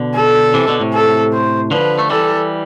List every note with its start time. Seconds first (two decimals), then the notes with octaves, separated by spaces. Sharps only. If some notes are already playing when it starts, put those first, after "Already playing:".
Already playing: B2 D3
0.15 A4
0.54 C3 E3
0.68 B2 D3
0.80 A2 C3
0.94 A4
1.33 C5
1.71 D3 F3 B4
1.99 A3
2.10 E3 G3 A4